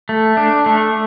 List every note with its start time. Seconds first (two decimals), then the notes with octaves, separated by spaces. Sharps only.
0.09 A3
0.37 D4
0.66 A3